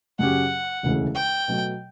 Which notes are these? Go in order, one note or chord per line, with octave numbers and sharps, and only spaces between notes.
F#2 C#3 F#3 C#4 G4 F#5
E1 D2 C#3 E3 A3
G5
B2 F#3 A3